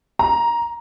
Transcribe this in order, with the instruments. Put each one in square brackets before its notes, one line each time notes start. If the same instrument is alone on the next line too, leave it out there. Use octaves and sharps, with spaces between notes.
[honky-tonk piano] A#5